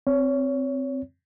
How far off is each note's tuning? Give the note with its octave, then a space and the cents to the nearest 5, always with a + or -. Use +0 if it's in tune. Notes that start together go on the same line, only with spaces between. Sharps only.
C4 +0 C#5 +25